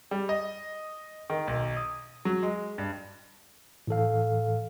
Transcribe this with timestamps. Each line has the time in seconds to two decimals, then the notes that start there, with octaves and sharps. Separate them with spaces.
0.11 G3
0.29 D#5
1.30 D#3
1.47 B1
1.77 D#6
2.25 F#3
2.43 G#3
2.78 G2
3.87 A2 E3 A4 F5